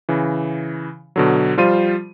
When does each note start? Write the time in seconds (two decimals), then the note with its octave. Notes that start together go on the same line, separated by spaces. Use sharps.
0.09 C#3 E3
1.16 B2 D3 F#3
1.57 F3 G3 F4 C5 D#7